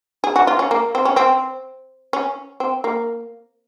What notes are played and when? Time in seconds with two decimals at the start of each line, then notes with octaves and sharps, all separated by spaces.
0.24 G#4
0.36 F#4
0.47 F4
0.59 C#4
0.71 A#3
0.95 C4
1.05 C#4
1.16 C4
2.13 C#4
2.60 C4
2.84 A#3